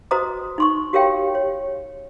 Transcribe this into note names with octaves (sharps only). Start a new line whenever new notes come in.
F#4 B4 C5 D#5 A#5 D#6
D#4 C6 C#6
F#4 G4 A#4 C#5 F5 G5
C#5